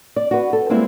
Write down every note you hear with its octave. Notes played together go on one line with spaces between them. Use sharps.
D5
F#4 B4
A4
G3 G#3 A#3 C4 E4